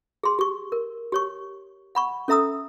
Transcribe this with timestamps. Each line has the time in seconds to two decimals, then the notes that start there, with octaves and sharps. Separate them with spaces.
0.23 G#4 C6
0.39 G4 C#6
0.72 A#4
1.12 G4 C#5 C#6
1.95 F#5 B5 C#6
2.28 C#4 A4 E5 A#5 D#6 E6